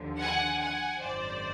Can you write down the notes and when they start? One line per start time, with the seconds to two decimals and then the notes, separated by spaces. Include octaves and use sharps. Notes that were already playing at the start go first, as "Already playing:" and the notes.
Already playing: D#2 D3 F3
0.21 F#5 G#5
0.60 F#5 G#5
1.02 G#1 F#2 D#3 C5 D5